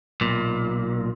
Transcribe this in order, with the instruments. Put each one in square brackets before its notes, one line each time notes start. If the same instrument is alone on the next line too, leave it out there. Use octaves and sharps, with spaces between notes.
[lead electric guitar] B1 A#2